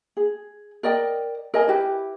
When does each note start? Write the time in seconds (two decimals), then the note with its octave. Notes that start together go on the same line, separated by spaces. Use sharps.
0.17 G#4
0.83 A#4 D5 D#5 G5
1.54 A#4 D#5 G#5
1.68 E4 G4 B4